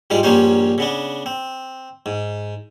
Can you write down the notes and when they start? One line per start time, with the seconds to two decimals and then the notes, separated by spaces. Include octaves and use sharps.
0.10 G#2 G3 G#3 F4
0.23 A#1 G2 G3 A#3 C#4 C5
0.78 C#3 B3 D4
1.26 C4
2.06 G#2